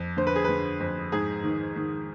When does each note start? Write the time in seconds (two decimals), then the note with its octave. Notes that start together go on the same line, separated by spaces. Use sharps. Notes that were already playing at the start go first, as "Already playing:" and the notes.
Already playing: F2
0.17 D3 C5
0.27 B4
0.36 G#4
0.44 D3 B4
0.80 F2
1.12 G#2 G#4
1.44 D#3
1.76 D#3